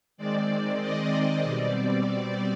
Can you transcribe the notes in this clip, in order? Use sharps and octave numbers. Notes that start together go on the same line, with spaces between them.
D#3 G#3 C4 D5
D#5
B2 G3 C4 D5
D5